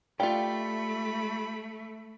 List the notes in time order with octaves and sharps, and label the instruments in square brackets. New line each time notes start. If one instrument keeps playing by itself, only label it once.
[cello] A3 [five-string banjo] F4 G4 [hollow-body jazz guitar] D5 F5 G5 [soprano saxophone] B5